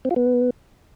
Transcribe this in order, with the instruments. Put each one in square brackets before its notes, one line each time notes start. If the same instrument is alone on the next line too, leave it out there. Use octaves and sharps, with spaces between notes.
[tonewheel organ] C4
F4
B3